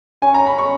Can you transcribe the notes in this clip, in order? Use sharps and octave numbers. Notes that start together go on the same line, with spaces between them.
C#4 G#5
A#5
B5
C#6